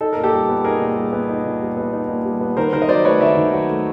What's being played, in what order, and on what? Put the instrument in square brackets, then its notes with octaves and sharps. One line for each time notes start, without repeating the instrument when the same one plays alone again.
[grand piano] D#4 A4
A#2 A#4
G4 A4
G3
B3
D#4 G#4 A#4
A#2
G3
B3
D#4
A#2
G3
B3
D#4
A#2
G3
B3
D#3 A#4 C5
D#3 A#4 C5
D#5
F#3 C5 D5
A3 B4 C#5
D#3 D5 E5
D#3
F#3
A3